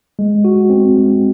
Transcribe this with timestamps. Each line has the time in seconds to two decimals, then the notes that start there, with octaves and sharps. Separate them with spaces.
0.19 G#3
0.45 F#4
0.70 C4
0.96 G#3